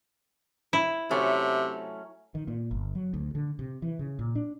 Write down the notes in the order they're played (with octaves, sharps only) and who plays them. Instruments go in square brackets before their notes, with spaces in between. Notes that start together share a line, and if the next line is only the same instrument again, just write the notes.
[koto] E4
[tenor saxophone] C3 [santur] F#3 C#4 [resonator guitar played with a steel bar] A3
[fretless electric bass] D#3
A#2
G1
F#3
D2
D3
C3
E3
C#3
A#2
D4